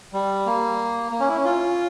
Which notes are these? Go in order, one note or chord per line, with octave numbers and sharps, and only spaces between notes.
G3
A#3
A#3
C#4
E4
C#4
F4